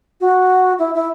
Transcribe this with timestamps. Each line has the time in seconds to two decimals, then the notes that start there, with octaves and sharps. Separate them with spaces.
0.21 F#4
0.79 E4
0.94 E4